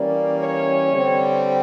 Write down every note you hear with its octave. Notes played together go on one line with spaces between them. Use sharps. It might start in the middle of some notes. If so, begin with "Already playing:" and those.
Already playing: E3 G3 A#3 C#4 D5
C#5
D3 G3 C4